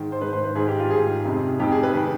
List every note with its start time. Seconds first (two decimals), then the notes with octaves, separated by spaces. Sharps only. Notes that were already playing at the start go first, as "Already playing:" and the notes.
Already playing: G#2 D#3
0.12 C5
0.21 G#2 D#3 B4
0.33 C5
0.44 B4
0.55 G#2 D#3 G#4
0.68 G4
0.80 F4
0.90 G#2 D#3 G#4
1.25 F2 C3 D#3
1.60 F2 C3 D#3 G4
1.72 G#4
1.83 B4
1.95 D#3